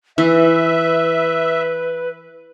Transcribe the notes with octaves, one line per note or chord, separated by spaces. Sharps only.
E3 B4 E5